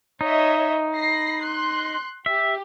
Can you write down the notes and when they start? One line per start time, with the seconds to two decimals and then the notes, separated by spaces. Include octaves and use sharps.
0.21 D#4 C#5 D#5 E5
0.95 B5 A#6 C7
1.43 C6 F#6
2.26 G4 E5